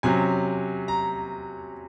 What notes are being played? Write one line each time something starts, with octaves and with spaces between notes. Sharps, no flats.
C3 F#3 C#4 G#5
A#5